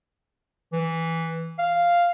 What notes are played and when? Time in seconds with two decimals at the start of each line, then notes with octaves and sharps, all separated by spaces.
0.72 E3
1.58 F5